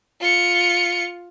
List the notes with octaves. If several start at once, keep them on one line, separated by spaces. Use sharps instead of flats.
F4 C#7